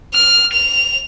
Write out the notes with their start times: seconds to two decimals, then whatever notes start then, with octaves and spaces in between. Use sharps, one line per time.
0.14 F6
0.53 F7